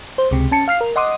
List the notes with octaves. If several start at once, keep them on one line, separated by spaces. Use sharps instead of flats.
C5
C#2 C3
C#4 A5 C#7
F5 F6 C7
A#4
D#5 F#5 C6 D6 D#6